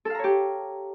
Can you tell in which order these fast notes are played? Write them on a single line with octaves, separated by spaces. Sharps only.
A4 F5 A#5 C#5 G4